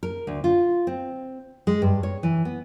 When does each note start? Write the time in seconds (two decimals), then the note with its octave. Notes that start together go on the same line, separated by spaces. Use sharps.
0.03 A#4
0.27 D2
0.44 F4
0.87 C4
1.67 G#3
1.82 G2
2.03 C#5
2.23 E3
2.45 B3